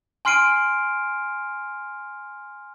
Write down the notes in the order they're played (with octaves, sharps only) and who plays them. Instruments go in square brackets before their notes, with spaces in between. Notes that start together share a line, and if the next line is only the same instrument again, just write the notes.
[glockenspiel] G#5 C6 F6 C7 D7 D#7